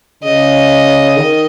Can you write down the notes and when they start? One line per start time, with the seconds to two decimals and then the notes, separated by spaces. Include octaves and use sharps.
0.23 C#3 D#5
1.17 D#3